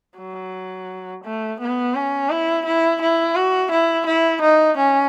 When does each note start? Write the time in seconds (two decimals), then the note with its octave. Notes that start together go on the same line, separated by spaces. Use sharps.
0.18 F#3
1.24 A3
1.60 B3
1.95 C#4
2.30 E4
2.65 E4
3.01 E4
3.36 F#4
3.71 E4
4.06 E4
4.42 D#4
4.77 C#4